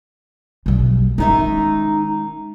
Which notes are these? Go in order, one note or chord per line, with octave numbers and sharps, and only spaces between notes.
B1 G3
D#3 G#3 C#4 D#4 E5